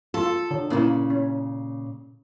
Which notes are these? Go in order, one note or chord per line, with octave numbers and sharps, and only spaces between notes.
F4 A4
D3
A#2 C#3 A#3 E4
C#4